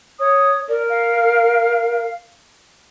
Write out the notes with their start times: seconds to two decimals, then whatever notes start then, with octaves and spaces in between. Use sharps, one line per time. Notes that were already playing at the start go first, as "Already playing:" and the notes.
0.20 C#5 D#6
0.69 A#4 D5
0.89 F5